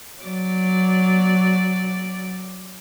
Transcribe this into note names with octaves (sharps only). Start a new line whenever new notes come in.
F#3 D5